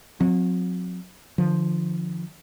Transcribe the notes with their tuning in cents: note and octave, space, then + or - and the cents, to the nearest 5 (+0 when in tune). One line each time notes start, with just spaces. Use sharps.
F#3 -35 C4 +0
D3 +40 F3 +0